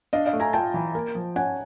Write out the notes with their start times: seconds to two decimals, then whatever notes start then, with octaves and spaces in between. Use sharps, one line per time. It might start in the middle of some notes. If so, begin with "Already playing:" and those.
0.13 D4 D#5 F5
0.26 D#5 F5
0.33 A3
0.40 G#5 A#5
0.53 F4 G5 A5
0.74 E3
0.95 A#3
1.15 F3
1.36 C#4 F#5 G#5